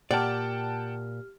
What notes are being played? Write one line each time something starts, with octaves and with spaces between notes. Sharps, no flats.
A#2 G4 D5 F#5 G5 A5 F6